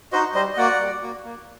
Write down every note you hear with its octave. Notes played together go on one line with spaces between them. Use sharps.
D#4 F#4 C5 D#5
G3 C5 D#5
D#5
A#3 F#4 D5 F#5
G3
A#3 F#4
A#3